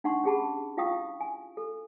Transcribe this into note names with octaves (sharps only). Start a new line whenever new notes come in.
D4 D#4 F#5 C6 C#6
C#4 G4 G#4 F#5 A5 B5
E4 F4 F5 G5 C#6 D#6
G#5
A4